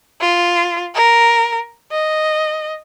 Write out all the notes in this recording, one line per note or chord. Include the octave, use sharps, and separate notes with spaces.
F4
A#4
D#5